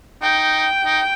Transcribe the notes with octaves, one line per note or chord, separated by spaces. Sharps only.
D#4 G5
D#4